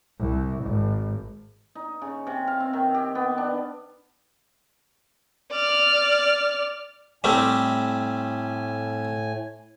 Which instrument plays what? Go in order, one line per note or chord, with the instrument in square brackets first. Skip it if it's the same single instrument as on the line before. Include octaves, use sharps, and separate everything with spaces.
[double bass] C2
G#1
[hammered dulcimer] D#4
C#3
C3
F5
C4
D#3
G4
B3
D4
[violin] D5 F6
[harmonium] A2 G#5 [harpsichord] G3 A3 C4